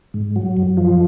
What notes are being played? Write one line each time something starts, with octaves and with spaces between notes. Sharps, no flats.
G#2
F#3
F#2
F3